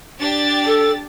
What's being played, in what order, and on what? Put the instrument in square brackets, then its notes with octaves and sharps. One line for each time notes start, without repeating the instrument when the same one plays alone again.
[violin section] D4 G4 A6
[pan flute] A4